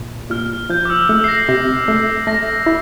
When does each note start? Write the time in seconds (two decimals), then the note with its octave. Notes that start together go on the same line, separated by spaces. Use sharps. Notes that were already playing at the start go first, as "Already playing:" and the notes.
Already playing: A#2
0.30 A#2 F6
0.69 F3 G6
0.85 D6
0.90 E6
1.09 A3 E6
1.24 C7
1.28 A#6
1.48 C3
1.88 A3
2.27 A3 A#6
2.66 E4